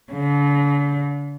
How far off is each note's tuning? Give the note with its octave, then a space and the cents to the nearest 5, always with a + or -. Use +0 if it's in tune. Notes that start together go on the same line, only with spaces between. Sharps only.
D3 -40